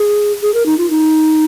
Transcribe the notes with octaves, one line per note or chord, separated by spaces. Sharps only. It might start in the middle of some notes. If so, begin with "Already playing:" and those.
Already playing: G#4
G#4
A#4
D#4
F4
D#4